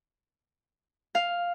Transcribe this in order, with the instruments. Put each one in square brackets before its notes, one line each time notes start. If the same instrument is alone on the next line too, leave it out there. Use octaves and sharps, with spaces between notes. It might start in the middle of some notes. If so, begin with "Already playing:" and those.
[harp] F5